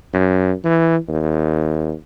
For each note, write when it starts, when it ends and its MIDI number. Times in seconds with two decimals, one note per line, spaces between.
0.14 0.53 42
0.64 0.97 52
1.08 1.93 39